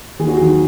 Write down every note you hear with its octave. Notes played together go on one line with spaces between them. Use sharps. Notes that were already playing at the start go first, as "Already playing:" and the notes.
D#2 G#4
F#4
D#3 F#3 G#4